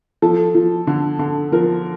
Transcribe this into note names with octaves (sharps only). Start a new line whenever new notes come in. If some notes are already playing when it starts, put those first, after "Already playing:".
F3 A4
F3
D3
D3
F3 A#4